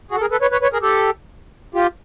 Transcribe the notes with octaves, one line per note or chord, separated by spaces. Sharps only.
F#4 G#4
A4
G#4 A#4
A4 B4
B4 C#5
B4 C#5
B4 C#5
G#4 A#4
G4 A4
F4 G4